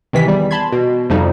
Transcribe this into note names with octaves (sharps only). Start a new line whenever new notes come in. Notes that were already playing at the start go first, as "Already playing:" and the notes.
C3 D#3 E3 B6
E2 G3
A5 B5 C6 G#6
B2
F2 C3 F3 G3 D#4